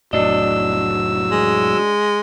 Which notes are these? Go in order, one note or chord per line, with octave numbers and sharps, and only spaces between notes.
F1 A2 F#3 D4 D#5 E6
G#3